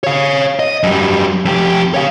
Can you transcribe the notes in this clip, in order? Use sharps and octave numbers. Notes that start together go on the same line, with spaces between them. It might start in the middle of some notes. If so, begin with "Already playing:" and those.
C#5 F5
D#5
F#2 G3
F2 G4
C#5 F5